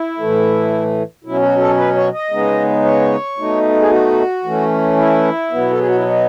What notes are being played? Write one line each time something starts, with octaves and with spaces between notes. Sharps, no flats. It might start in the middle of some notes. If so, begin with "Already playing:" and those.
Already playing: E4
A2 E3 A3
B2 F#3 C#4 E4
F#4
A4
B4
C#5
D#5
C#3 G#3 B3 D#4
C#5
B2 A3 D#4
G#4
F#4
E3 A3 C#4
E4
B2 F#3 B3
A4
G#4
F#4
E4
D#4